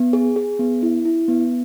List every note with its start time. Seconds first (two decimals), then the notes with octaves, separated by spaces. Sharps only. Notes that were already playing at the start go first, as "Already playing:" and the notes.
Already playing: B3
0.13 G#4
0.36 G#4
0.59 B3
0.83 E4
1.05 E4
1.28 B3